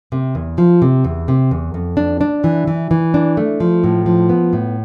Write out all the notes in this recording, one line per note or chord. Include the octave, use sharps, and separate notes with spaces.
C3
E2
F3
C3
E2
C3
E2
F2
D4
D4
E3
E3
E3
D4
A3
F3
A2
F3
B3
A2